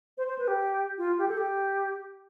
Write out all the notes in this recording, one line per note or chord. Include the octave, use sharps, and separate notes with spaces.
C5
C5
B4
G4
F4
G4
A4
G4